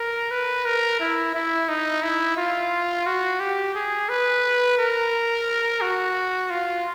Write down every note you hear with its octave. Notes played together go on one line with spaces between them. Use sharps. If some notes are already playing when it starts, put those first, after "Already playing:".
Already playing: A#4
B4
A#4
E4
E4
D#4
E4
F4
F#4
G4
G#4
B4
A#4
F#4
F4